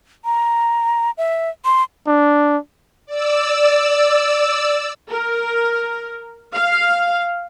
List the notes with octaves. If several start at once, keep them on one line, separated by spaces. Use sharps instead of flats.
A#5
E5
C6
D4
D5 E6
A#4
F5